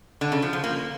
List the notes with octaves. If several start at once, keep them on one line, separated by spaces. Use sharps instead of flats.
D3
C#3
F3
F3
A#3